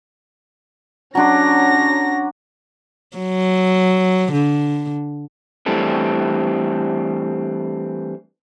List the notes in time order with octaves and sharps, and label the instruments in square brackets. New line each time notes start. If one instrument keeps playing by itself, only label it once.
[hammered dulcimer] F#3 D4 C6 [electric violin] C#4 A#6
[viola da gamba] F#3
D3
[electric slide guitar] E3 G3 A3 C4 D4